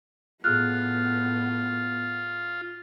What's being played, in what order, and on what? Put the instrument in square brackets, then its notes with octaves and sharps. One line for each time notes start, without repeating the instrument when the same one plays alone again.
[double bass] A2 [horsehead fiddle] B3 [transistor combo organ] F4 [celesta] G#4 F6 F#6